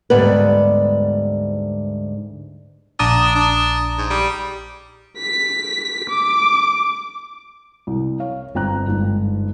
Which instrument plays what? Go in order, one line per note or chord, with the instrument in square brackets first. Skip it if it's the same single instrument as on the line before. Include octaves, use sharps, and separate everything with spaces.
[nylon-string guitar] D2 G#2 G3 B3 B4
[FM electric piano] A#1 A#5 D#6 [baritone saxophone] D4
[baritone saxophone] D4
G#2
G3
[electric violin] B6
D6
[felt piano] C2
C#5 F5
G1 C4 G5 A#5 F#6
G1 G#2